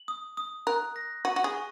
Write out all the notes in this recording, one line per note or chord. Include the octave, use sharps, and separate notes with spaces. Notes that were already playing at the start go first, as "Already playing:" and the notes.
Already playing: F#7
D#6
D#6
A#4 F#6
A#6
F#4 D#7
F#4
G#4
C#6